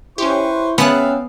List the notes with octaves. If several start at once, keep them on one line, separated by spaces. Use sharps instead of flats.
C#4 E4 G4 B4 C5 C#6
B3 C#4 G#4 E5 F5 G5 A5 F#6